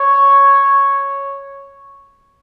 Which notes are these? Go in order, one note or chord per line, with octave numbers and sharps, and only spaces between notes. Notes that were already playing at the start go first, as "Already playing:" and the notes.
Already playing: C#5